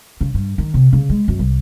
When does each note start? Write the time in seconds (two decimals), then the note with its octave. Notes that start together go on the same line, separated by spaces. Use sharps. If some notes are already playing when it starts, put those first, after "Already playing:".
0.21 C#3
0.34 G2
0.58 D#3
0.74 C3
0.93 C#3
1.09 G#3
1.28 F#2
1.39 C2